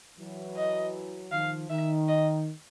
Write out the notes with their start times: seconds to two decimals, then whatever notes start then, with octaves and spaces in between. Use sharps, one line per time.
0.19 E3 F#3
0.56 D#5
1.32 D#3 F3 F5
1.70 D#3 E5
2.08 D#5